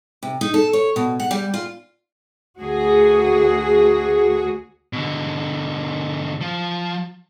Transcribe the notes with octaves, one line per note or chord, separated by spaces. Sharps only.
C3
D#4
A4
C#5
B2
F#5
G3
F4
D2 F#4 G#4
B2 D3
F3